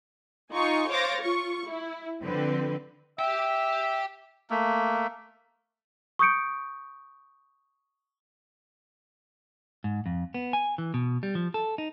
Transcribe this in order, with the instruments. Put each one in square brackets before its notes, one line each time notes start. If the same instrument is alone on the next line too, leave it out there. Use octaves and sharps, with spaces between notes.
[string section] D#4 F4 G#5 C#6
C5 C#5 F5 D6 A6 A#6
F4 C#6
E4
D3 F3 C4 B4
[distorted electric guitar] G4 G5 [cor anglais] E5
[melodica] A3 A#3
[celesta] C#6 D#6 G6 C#7 D7
[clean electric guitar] G#2
F2
B3
G#5
E3
B2
G3
F3
A4
D#4